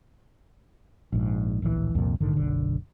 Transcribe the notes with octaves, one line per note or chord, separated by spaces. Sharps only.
A#1 G#2
D1 A#1 B2 E3
C2 F2 A#2
A#1 G#2 D3 D#3
F#1 B1 D3